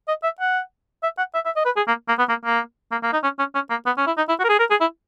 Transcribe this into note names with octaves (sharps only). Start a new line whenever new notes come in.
D#5
E5
F#5
E5
F#5
E5
E5
D#5
B4
G#4
A#3
A#3
B3
A#3
A#3
A#3
A#3
D#4
C#4
C#4
C#4
A#3
B3
C#4
E4
D#4
E4
F#4
A#4
G#4
A#4
G#4
E4